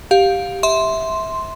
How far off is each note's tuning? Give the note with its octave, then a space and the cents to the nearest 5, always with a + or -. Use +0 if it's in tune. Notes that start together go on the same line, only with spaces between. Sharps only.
G4 +0 F5 +15
E5 -20 C6 +0